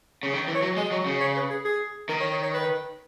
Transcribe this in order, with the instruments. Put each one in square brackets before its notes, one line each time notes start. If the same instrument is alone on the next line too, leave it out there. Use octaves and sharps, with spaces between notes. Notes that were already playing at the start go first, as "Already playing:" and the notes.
[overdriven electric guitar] C#3
D#3
E3
[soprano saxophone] C#5
[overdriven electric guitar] F#3
[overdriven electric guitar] G#3 [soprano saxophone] D#5
[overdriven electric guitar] F#3
C#3
[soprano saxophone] C#5
B4
G#4
G#4
[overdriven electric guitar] D#3 [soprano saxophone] A#4
[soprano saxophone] C#5
C#5
C#5
B4